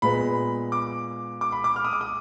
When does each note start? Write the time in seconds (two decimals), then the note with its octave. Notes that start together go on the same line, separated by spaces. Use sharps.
0.02 A#2 G#3 B3 B5
0.72 D6
1.41 D6
1.52 B5
1.64 D6
1.76 F6
1.85 D#6
1.93 D6
2.01 D#6